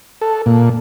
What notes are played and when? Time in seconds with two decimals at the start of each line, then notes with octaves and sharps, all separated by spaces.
0.21 A4
0.46 A#2